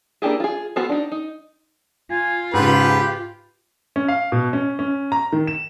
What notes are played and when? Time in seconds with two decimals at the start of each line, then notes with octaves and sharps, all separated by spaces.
0.22 A#3 D4 E4 G4 G#4
0.40 F4 G#4
0.76 B3 F4 F#4 A4 C5
0.89 D4 D#4
1.12 D#4
2.11 F4 G#5
2.54 G#2 C#3 G4 B4
3.96 C#4
4.08 F5
4.32 B2
4.53 C#4
4.79 C#4
5.12 A#5
5.33 D#3
5.47 E7